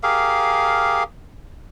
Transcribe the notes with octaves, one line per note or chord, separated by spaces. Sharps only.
G4 G#4 A#4 F5